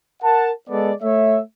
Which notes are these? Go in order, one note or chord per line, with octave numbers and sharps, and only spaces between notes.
A#4 F#5 A5
G#3 B3 A4 D5
A3 C#5 E5